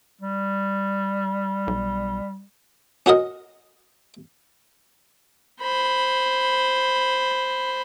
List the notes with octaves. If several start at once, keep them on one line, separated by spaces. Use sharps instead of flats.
G3
B1
C#4 F#4 A#4 D#5
C5 B5